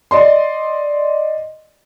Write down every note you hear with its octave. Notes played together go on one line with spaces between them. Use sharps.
D5 D#5 C6